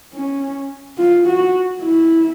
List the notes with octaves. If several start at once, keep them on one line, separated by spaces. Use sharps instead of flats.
C#4
F4
F#4
E4